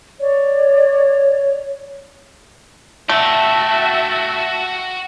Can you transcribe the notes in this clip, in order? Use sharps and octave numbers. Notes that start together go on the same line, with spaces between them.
C#5 D5
A3 F#4 E5 G5 A5